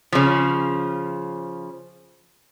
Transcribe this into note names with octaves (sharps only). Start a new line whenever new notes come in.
C#3 F3